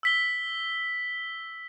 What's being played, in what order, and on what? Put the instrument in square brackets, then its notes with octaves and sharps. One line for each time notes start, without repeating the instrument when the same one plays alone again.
[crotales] E6 B6 G7